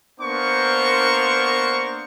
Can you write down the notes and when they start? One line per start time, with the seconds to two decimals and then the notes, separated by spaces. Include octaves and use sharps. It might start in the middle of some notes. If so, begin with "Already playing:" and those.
0.20 A#3 B3 D4 A#4 C5 C#6